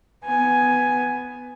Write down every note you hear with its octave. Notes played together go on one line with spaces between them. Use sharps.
B3 G#5